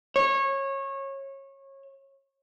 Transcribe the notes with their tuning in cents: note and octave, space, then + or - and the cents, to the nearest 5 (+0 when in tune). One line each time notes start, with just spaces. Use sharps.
C#5 -25